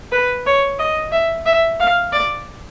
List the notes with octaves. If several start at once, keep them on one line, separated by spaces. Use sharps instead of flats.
B4
C#5
D#5
E5
E5
F5
D5